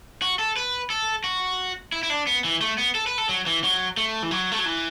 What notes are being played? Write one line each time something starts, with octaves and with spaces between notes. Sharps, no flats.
F#4
A4
B4
A4
F#4
E4
E4
D4
B3
E3
A3
B3
A4
B4
A4
F#3
E3
F#3
A3
E3
F#3
A3
F#3
E3